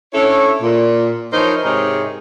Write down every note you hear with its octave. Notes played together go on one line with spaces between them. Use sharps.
C#4 D4 E4 A4 C#5
A#2
E3 F3 D#4 A#4 C5 C#5
G#2 C3 D#4 G#4 A#4 C#5